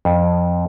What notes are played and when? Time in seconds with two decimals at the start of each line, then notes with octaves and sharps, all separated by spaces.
0.05 F2